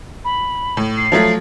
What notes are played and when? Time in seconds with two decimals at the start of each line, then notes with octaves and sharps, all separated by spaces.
0.25 B5
0.77 A2
0.97 C7
1.12 F3 F#3 A3